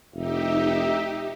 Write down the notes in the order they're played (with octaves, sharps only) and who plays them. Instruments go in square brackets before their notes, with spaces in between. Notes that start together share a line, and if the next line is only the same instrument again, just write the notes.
[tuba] F1 [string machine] D#4 G4 [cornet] E5